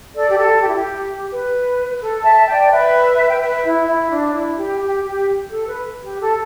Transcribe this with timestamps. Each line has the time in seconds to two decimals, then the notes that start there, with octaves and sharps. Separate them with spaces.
0.14 A4 D5
0.29 G4
0.37 A4
0.61 G4
0.68 E4
0.75 G4
1.30 B4
2.00 A4
2.23 E5 A5
2.40 E5
2.47 D5 G5
2.70 B4 E5
3.29 G5
3.40 B4 E5
3.64 E4
3.86 E4
4.10 D4
4.33 E4
4.56 G4
4.80 G4
5.04 G4
5.50 A4
5.67 B4
6.03 G4
6.20 A4